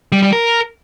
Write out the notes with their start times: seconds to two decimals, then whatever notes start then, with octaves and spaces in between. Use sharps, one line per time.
0.12 G3
0.22 G3
0.33 A#4